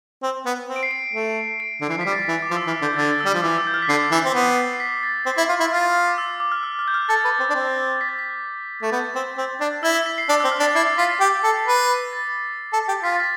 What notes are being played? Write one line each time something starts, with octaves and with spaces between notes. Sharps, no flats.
C4
B3
C4
D7
C7
D7
A3
D7
D3
E3 C7
F3
G3 B6
A6
B6
E3
D6
F3
E6
E3
F6
D3 G6
D3 A6
E6
G3
F3
E3 D6
E6
G6
F6
B6
D3 C7
E3
C4
B3
C7
B6
B6
A6
C4
E4
F4
E4
F4
D6
E6
D6
F6
E6
F6
G6
F6
A4 A6
B4
C4
D4
C4
B6
A6
B6
A3 A6
B3 G6
C4
C4
D4
E4 E6
E6
B6
C7
D4 D6
E6
C4
F6
D4
A6
E4 C7
C7
F4 B6
C7
G4 B6
A4
B4
A6
A4
G4
F4 B6
A6
B6